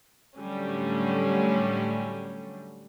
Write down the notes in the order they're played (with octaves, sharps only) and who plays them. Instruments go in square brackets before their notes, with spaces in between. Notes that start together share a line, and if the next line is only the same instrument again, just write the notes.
[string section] A2 D3 F#3 G3 A3 C#4